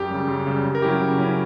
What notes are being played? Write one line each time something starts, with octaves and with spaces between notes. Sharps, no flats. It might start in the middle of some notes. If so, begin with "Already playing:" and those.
Already playing: F#2 G4
C#3 G3
F#2
C#3 G3
C#3
A#4
F#3 C#4 E4 G4
C#3
F#3 C#4 E4